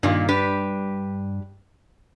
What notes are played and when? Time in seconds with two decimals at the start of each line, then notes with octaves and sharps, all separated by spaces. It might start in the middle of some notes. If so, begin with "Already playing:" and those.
0.03 G2 A#2 D#3 A#3
0.29 D4 G4 B4